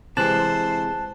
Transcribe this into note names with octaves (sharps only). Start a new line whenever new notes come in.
C3 E3 G#3 C5 A5 F#6